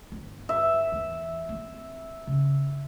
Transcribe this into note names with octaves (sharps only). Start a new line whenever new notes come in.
G1
E5
E2
C4
C#3